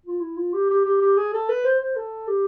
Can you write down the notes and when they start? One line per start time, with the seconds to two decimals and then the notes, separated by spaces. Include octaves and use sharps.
0.06 F4
0.21 E4
0.37 F4
0.54 G4
0.70 G4
0.85 G4
1.01 G4
1.17 G#4
1.33 A4
1.49 B4
1.65 C5
1.80 C5
1.96 A4
2.28 G4